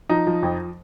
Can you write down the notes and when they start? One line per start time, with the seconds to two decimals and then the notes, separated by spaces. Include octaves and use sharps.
0.09 F3 D#4
0.27 F3
0.43 F2